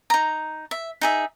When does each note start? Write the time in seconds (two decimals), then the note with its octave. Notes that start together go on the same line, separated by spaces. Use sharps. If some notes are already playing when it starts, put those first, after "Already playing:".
0.10 D#4 A#5
0.71 E5
1.01 D#4 G#4 E5